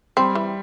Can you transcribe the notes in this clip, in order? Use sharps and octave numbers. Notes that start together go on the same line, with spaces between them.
G3 C4
E3